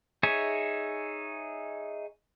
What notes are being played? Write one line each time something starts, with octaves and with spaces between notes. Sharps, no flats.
D#4 G#4 C#5 E5 G#5